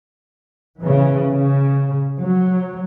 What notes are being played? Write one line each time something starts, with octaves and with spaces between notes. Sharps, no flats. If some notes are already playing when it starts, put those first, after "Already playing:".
C#3 E3
C#3
F#3